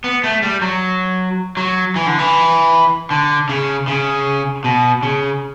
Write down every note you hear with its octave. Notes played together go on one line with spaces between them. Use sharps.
B3
A3
G3
F#3
F#3
E3
D3
E3
D3
C#3
C#3
B2
C#3